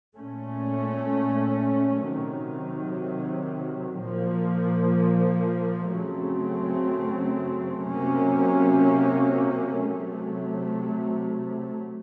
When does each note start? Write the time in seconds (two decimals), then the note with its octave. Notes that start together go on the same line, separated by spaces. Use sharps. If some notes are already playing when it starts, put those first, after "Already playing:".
0.17 A#2 A3 C#4
2.09 C3 D#3 F#3
4.03 A#2 F3 A#3
5.94 F#2 C#3 F#3 A3 C4
7.87 C3 F#3 A#3 C#4
9.81 C3 F#3 A3